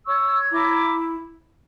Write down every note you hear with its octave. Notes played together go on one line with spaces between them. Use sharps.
C#5 C#6 E6
E4 A#5 D6